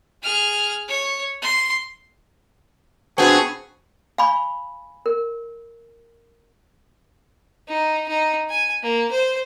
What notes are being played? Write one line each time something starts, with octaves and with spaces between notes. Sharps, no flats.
G#4 F6
C#5
C6
B2 B3 C4 D4 F#4 G#4 F#5
F5 G#5 B5 C#6
A#4
D#4
D#4
G#5
A#3
C5